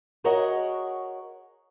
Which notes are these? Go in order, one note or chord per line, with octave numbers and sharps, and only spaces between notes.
F#4 G#4 A#4 C#5 D#5 F#5